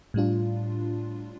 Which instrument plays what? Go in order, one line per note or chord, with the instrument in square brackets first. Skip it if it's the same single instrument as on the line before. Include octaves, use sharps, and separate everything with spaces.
[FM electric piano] A2 G3 D4 F4